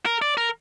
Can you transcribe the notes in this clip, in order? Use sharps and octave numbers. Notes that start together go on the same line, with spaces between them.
A#4
D5
A#4